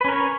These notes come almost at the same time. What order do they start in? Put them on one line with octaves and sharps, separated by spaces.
B4 C#4 A#4 C#5